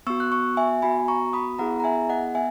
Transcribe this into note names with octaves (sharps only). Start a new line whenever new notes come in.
B3 F#4 C#6 E6
F#6
C#6 E6
E5 G#5
B3 F#4 G#5 B5
A#5 C#6
B5 D#6
B5
B3 E4 G#4 F#5 A#5
A#5
E5 G#5
D#5 F#5
B3 E5 G#5